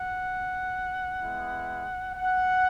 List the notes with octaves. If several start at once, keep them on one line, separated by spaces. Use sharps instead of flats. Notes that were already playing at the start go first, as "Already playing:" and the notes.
Already playing: F#5
G#3 B3 E4
F#5